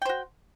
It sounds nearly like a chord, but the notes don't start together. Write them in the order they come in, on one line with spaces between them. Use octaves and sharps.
G5 C5 F#4